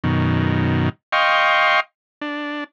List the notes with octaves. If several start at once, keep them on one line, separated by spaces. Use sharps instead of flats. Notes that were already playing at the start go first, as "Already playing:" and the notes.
F#2 B2 D#3
D#5 F5 G5 C6 C#6
D4